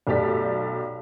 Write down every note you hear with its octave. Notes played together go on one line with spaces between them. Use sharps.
B1 A3 G4 A4 D5 B6